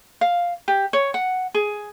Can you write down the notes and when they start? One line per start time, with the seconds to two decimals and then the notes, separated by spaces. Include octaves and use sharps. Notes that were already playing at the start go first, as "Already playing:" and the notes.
0.21 F5
0.68 G4
0.93 C#5
1.14 F#5
1.54 G#4